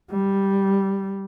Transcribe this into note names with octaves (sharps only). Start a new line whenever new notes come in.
G3